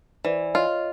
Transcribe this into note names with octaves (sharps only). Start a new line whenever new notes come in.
E3 C5 D5
F4 C#5 D#5